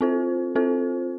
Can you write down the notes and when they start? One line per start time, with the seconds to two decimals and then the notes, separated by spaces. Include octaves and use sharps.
0.01 C4 F4 A4 C5
0.55 C4 F4 A4 C5